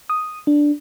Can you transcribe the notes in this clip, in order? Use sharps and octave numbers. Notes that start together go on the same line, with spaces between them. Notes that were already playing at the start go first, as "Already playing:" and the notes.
D#6
D4